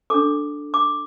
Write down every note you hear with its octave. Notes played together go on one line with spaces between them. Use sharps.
D4 A4 D6
D6